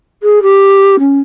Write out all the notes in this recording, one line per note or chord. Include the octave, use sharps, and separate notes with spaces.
G#4
G4
C#4